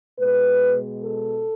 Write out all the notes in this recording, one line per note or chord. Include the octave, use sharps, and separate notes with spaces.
B2 G#3 B4
A4